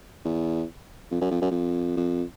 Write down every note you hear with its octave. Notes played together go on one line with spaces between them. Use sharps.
E2
F2
F#2
F2
F#2
F2
F2